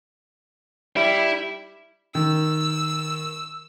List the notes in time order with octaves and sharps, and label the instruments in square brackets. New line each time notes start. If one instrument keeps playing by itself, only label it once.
[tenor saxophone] G3 [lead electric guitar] E4
[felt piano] D#3 [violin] E6